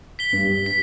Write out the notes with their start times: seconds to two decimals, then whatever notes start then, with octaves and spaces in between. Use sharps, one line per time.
0.19 B6 G7
0.33 G2
0.66 B6